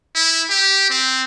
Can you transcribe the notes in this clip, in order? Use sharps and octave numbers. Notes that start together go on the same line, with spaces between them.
E4
G4
C4